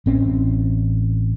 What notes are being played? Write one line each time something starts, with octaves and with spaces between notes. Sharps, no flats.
A1 C4 C#4